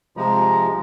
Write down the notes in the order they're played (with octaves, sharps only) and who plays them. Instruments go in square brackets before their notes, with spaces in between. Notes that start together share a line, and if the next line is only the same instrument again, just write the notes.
[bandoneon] C3 F3 G#3 [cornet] A#5